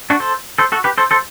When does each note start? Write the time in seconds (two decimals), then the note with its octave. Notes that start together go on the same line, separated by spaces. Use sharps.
0.10 D4 F#4
0.20 A4 C5
0.58 A4 C5
0.72 F#4 A4
0.84 G4 B4
0.98 A4 C5
1.11 A4 C5